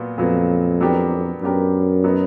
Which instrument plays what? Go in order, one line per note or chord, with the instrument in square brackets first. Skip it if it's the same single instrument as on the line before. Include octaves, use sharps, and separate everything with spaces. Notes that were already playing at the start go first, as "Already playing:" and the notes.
Already playing: [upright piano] A#2 F#3 B3
[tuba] F2 [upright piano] A#2 F#3 B3
[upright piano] F#3 B3 D4 G4 A#4
[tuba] F#2 [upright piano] F#3 B3 D4 G4 A#4
[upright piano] F#3 B3 D#4